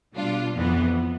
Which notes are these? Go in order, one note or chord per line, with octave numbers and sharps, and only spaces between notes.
B2 G3 D4 F4
F2 E3 B3